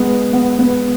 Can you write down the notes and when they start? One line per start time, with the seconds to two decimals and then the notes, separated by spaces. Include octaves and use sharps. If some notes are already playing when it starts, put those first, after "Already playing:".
Already playing: G#3 B3
0.33 B3
0.59 B3